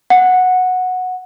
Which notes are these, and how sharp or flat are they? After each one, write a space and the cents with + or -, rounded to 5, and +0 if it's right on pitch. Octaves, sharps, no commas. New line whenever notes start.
F#5 -10